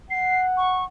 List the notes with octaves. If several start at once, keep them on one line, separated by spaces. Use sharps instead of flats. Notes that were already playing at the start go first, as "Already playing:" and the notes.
F#5 C7
C#6